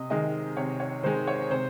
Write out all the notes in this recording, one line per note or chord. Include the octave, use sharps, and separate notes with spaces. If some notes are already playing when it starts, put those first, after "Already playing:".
Already playing: C3 D#5
D#3 G#3 D#5
C3 C#5
C#5
D#3 G#3 C5
C#5
C3 C5